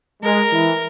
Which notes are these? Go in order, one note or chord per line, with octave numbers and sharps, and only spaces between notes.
G#3 A#4
E3